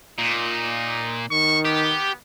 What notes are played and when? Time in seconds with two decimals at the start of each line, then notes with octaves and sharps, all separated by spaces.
0.19 A#2 D#4
1.31 D#3 C#6
1.65 B3 G4